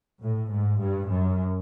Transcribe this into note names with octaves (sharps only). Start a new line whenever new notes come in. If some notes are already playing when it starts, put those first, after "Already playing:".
A2
G#2
G2
F#2